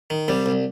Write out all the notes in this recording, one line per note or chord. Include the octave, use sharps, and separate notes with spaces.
D#3
C2 G3
C2